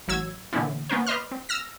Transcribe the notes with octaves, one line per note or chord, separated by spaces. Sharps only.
A1 F#3 E6 G#6
A#2 D3 E3 B3 C#4 E4
A#3 B3 C#4 A#4 C5
B4 D5 D#5 C6 F6
C4
E6 F6 A#6